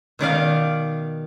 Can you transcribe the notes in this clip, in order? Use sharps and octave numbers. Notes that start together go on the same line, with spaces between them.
B2 D#3 D5 F5